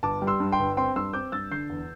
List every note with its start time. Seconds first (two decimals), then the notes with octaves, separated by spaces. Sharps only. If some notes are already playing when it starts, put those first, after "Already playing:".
0.03 G1 A5 D6
0.22 G3
0.27 C6 E6
0.40 G2
0.52 G5 C6
0.59 G1
0.77 C4 G5 C6
0.96 G2 C6 E6
1.13 C4 D6 G6
1.32 G2 E6 A6
1.51 D3 G6 C7
1.70 E2